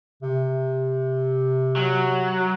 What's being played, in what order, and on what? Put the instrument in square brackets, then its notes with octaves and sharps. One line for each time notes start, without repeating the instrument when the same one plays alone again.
[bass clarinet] C3
[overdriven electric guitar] F#3